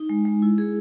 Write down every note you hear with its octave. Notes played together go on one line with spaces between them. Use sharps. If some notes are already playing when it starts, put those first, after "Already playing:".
Already playing: D#4
G#3
G#3
E4
G#4